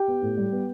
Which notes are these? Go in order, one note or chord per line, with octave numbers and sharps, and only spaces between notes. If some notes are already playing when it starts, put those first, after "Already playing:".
Already playing: G4 G5
B3
A2
G3
B3